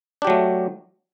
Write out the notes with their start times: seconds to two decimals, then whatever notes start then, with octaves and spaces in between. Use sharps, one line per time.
0.22 D4
0.25 G4
0.27 F#3
0.30 A3